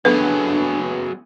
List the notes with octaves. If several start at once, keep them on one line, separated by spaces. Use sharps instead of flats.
A1 F#3 A3 B3 D4 G#4 B4